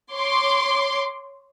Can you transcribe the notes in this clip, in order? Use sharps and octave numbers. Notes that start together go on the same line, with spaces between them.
C#5 C6 D6